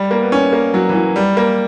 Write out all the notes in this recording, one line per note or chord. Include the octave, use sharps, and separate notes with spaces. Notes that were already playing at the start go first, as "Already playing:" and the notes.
Already playing: G3
A#3
B3
C#4
A#3
F#3
E3
F#3
G3
A#3